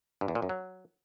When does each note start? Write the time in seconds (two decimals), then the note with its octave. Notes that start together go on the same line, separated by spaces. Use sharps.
0.21 G2
0.28 E2
0.35 A#2
0.42 F#2
0.49 F#3